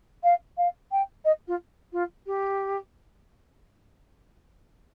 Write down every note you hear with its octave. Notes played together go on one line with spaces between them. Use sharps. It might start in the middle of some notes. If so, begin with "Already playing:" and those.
F5
F5
G5
D#5
F4
F4
G4